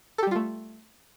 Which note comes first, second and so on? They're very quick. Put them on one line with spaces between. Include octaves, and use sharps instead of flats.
A4 G4 G3 F4 A3